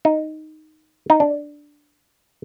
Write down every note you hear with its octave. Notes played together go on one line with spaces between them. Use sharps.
D#4
D#4
D4